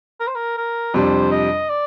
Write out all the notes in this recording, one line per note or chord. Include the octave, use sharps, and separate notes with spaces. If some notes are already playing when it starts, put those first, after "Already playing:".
A#4
C5
A#4
A#4
F2 C3 G3 D4 C5
D#5
D5